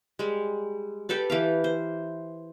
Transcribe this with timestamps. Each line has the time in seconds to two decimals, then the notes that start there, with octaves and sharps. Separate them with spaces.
0.19 G3 G#3
1.09 G4 A4 B4 D5
1.30 E3 G4 F5
1.64 C5